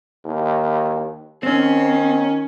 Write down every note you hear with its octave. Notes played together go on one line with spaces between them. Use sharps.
D#2
D#3 C4 C#4